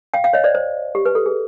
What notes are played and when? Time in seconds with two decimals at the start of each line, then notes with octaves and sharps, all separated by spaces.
0.14 F5 G5
0.24 F5 G5
0.33 C#5 D#5
0.44 C5 D5
0.55 C5
0.95 G4
1.05 B4
1.15 A4
1.26 G#4